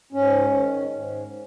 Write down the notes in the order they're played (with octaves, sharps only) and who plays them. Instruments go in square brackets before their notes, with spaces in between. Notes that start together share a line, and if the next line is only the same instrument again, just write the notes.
[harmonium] G#2 C#4
D#3
G#2